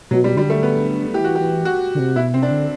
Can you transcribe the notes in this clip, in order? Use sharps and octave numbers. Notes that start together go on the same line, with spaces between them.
B2 F#3
G3
D3 G3
A3
B3
E3 G4
F#4
G4
E3
F#4
D3
C3
B2 E4
C3 C4
D4
D3